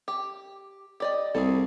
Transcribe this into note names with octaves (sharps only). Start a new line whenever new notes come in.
G4
G4 D5 D#5
C2 G#4 A4